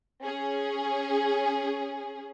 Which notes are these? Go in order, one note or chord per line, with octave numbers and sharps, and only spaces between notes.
C#4 G#4